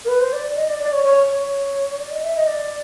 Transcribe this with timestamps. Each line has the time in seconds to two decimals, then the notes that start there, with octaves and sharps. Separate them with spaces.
0.05 A#4
0.08 B4
0.20 C5
0.33 D5
0.56 D#5
0.68 D5
0.80 D5
0.92 C#5
1.04 C#5
1.27 C#5
1.99 D5
2.11 D#5
2.23 E5
2.36 D#5
2.47 D5